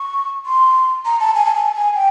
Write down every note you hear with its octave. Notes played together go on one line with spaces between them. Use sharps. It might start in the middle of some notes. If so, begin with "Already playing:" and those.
Already playing: C#6
C6
A#5
A5
G#5
A5
G#5
A5
G#5
G5